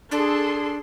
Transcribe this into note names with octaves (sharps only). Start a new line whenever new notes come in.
D4 G#4 A4 C6